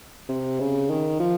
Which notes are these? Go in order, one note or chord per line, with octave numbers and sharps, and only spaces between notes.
C3
C#3
D#3
F3